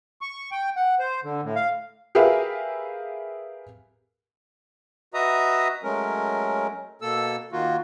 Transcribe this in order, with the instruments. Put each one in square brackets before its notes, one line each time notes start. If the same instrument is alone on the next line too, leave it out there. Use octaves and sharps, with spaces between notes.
[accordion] C#6
G5
F#5
C5
D3
A2
F5
[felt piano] G4 G#4 A#4 B4 E5 F5
[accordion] F#4 B4 D#5 E5 A#5 D#6
F#3 G#3 A3 C#4 A#4
B2 A#3 A4 E6
D#3 A#3 F4 F#4